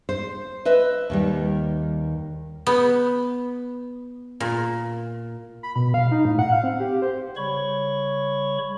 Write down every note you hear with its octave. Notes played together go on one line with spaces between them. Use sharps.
C5
B4 D#5 E5
D#2 D#3 G3
B3
A#2
B5
B2
F5
D#4
A2
F#5
F5
C4
G4
C5
C#3 G3 C#5 B5 C#6